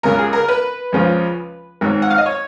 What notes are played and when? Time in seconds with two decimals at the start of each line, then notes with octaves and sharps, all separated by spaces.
0.03 C#2 C#3 F#3 A#4
0.19 G#4
0.33 A#4
0.48 B4
0.92 C#2 C#3 F3
1.81 G#1 G#2 F#3
2.02 F#5
2.10 F5
2.18 D#5
2.26 C#5